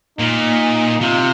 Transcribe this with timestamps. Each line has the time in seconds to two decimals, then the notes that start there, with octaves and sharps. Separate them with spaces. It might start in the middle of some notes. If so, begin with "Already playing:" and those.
0.19 A#2 D#4
1.01 C3 F4